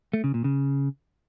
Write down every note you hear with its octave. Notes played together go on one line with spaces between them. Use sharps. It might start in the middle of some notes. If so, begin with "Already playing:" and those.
A3
C#3
A#2
C#3